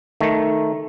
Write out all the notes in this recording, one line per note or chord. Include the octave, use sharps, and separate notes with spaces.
D#3 A3